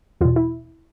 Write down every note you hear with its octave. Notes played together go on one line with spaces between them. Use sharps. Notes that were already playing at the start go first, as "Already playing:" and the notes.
E2 B2 F4
E4